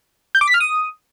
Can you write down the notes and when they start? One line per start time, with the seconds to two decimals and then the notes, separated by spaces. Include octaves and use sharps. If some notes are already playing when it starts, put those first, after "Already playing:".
0.35 G6
0.41 D6
0.48 B6
0.54 F6
0.60 D#6